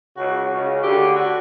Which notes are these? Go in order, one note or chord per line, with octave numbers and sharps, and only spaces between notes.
C#2 C#3 F#4
C#2 C#3
D2 D3 G4
F#4